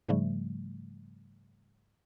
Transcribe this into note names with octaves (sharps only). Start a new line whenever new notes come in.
G#2 C#3 F3 G3 A3